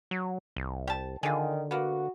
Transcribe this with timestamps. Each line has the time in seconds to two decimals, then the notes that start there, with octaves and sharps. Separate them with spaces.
0.11 F#3
0.56 C2
0.87 G4 A5
1.23 D3 D#3 F4 G#4
1.71 A#3 B3 F#4